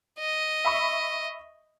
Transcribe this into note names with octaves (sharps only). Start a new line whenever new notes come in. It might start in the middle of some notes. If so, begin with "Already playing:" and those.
D#5
E5 B5 C#6